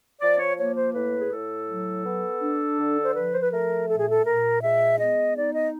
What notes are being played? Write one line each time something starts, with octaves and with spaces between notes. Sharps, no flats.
F3 D5
C#5
A#3 C#5
C5
A2 B4
G#4
A2 A4
F#3
B3
D4
D3
C5
F3 B4
C5
B4
A3 A#4
A#2 A4
G#4
A4
A#2 A#4
G#3 E5
B3 D#5
D#4 D5
D#5